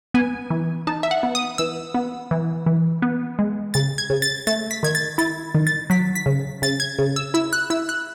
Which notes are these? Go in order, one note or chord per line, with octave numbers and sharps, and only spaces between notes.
B3 G#5
E3
D#4 A5
E5
F#5
B3
D#6
E3 E6
B3
E3
E3
B3
G#3
C#3 A6
G#6
C#3
A6
A3 A6
B6
D#3 G#6
A6
E4 A6
D#3
A6
F#3 B6
B6
C#3
C#3 A6
G#6
C#3
E6
E4 E6
F#6
E4 E6
F#6